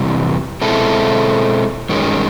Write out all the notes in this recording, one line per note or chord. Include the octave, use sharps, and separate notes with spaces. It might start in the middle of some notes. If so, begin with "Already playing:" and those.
Already playing: F2 C3 E3 G3
B2 G#3 C4 E4 A4
G2 D#3 G#3 C#4